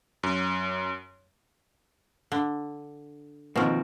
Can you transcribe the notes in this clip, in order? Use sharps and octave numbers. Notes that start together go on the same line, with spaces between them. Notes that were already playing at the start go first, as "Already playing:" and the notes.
F#2
D3
B2 D#3 F3 A#3 C4